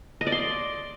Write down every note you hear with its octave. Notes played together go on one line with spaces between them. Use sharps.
D#5
D5
C6